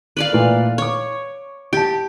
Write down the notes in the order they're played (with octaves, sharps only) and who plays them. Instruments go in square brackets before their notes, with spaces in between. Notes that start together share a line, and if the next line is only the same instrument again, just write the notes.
[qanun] B4 D5 F5
[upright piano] A#2 E3 A3
[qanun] C#5 [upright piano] C#6 D6
[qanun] G4 [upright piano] A5 D7